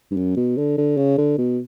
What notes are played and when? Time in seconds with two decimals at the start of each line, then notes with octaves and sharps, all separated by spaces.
0.11 G2
0.17 F#2
0.37 B2
0.57 D3
0.78 D3
0.97 C#3
1.18 D3
1.38 B2